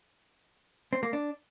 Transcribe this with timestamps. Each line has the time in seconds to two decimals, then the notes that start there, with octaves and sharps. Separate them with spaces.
0.93 C4
1.03 A#3
1.13 D4